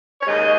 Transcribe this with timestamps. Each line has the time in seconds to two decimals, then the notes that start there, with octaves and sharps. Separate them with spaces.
0.21 C#5
0.25 D#2 C#3 G#3 D#5